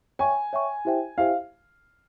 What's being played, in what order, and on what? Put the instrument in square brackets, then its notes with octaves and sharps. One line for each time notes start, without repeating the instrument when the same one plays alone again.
[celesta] C#5 E5 G5 C#6 [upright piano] G#5
[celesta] C#5 E5 G5 C#6
E4 G4 C5 E5 G5
[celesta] E4 G4 C5 E5 G5 [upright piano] F5